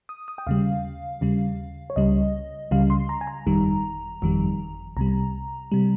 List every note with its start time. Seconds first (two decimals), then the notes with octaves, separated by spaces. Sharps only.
0.09 D#6
0.28 D#6
0.38 G5
0.47 D#2 C#3 G3 F5
1.21 D#2 C#3 G3
1.90 C#5
1.96 C#2 C#3 G3 D#5
2.71 C#2 C#3 G3 F5
2.90 C6
3.09 A#5
3.21 G#5
3.27 A#5
3.47 G1 F2 D#3 G3
4.22 G1 F2 D#3 G3
4.97 C2 C3 G3 A#5
5.72 C3 G3